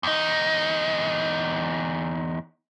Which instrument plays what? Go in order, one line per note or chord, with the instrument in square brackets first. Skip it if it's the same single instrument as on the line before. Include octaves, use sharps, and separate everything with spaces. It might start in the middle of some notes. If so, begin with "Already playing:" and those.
[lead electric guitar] E2 D#4